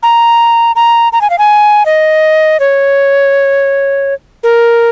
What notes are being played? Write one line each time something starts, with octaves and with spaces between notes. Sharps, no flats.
A#5
A#5
A#5
G#5
F5
G#5
D#5
C#5
A#4